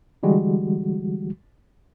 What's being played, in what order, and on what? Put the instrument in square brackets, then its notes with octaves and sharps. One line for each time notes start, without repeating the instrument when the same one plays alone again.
[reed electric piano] D3 E3 G3 G#3 F#4